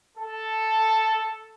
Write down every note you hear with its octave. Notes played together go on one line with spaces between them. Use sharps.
A4